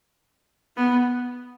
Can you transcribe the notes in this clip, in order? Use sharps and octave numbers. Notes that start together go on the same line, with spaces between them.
B3